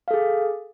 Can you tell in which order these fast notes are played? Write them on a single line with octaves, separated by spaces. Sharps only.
F5 A4 G#4